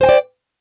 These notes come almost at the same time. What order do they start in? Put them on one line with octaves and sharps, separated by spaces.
C5 G#5 G5 D5